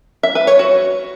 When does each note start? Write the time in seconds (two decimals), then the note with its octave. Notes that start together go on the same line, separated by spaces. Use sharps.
0.23 E5
0.35 B4
0.47 C#5
0.59 F#4